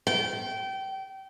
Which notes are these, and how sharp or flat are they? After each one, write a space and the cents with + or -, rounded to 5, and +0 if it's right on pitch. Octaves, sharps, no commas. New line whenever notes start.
G5 -25